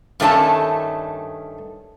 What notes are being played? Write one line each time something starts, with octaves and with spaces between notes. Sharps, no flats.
G2 D#3 A3 C#4 A4 A5